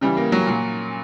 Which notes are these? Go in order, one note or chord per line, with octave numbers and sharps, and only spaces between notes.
C#3 E3 G3
A#3
F#3
A#2 F#3